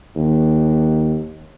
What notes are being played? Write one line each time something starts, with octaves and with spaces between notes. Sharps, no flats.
D#2